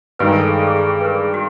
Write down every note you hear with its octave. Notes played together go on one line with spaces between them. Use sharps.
G2 D#3 G#3 B4
A#4
A4
G#4
A4
G#4
G4
G#4
B4
A#4
G#4
F#4